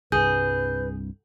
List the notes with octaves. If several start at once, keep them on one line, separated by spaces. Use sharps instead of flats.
C2 G2 G#4 B4 G6